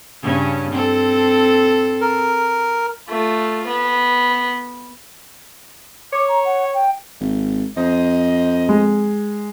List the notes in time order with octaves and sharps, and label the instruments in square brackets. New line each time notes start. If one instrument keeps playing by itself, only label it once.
[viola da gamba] G2 C#3 C#4
C4 A4
[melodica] A#4
[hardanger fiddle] A3 F4
B3
[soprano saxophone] C#5 [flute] D6
[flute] A#5
F#5
G5
[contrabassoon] G#1
[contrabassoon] F2 [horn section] C5 D#5
[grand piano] G#3